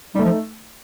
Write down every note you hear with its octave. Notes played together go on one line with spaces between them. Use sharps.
G3 A3 D#4
F3